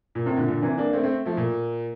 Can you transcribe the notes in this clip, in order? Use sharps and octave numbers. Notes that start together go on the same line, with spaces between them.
A#2
A2 C3
A#2 D3
A#2 D3
C3 E3
A#3 D4
A3 C4
A3 C4
F3 A3
A#2